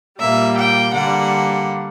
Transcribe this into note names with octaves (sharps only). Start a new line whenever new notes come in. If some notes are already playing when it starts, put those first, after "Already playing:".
A#2 G3 A#3 E5
G5
D3 G3 A#3 F#5